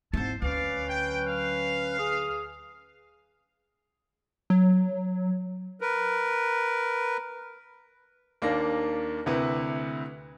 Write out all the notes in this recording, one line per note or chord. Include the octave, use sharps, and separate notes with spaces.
G#2 F#3 C4 E4 A4 C5 A5
D2 F#3 C#4 B4 D5 F5
G5
F5
G#4 D#6
F#3
A#4 B4
D#2 A#3 D4 A#6
D2 C3 E4 B4